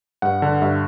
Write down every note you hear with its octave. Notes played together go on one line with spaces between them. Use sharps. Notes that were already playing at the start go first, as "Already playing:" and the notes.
G2 F#5
D3
G2 E5